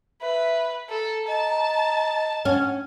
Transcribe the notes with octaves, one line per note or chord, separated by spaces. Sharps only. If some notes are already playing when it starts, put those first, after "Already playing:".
B4 E5
A4 A#5
D#5 A5
C#4 F#5